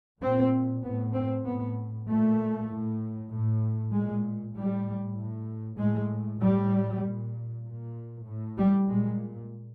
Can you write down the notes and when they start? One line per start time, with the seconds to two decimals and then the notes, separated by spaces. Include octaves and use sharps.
0.22 A#2 C4
0.84 A2 B3
1.15 C4
1.45 A2 B3
2.07 A#2 A3
2.69 A2
3.31 A2
3.93 A#2 G#3
4.54 A2 G3
5.17 A2
5.78 A2 G#3
6.40 A2 G3
7.02 A#2
7.65 A#2
8.26 A2
8.57 G3
8.88 A#2 G#3